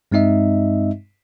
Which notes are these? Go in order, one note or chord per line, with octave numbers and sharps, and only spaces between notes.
G2 G#3 C4 D#4 D#5 E5